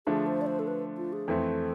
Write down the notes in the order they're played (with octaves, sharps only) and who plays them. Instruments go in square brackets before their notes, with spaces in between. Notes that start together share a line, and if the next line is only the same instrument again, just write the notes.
[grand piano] D3 F3 A3 D4 [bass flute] G#4
[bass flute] C5
D5
C5
A4
B4
F4
G#4
[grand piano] F2 E3 A3 C4 [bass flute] A4